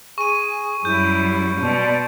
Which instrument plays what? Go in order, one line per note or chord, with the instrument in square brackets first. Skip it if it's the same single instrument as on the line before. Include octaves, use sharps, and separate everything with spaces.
[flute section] G#4 G#5 [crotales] C#6 D#7
[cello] F#2 G3 [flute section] E4 [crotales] G6
[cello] B2 [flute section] D5 A5 C6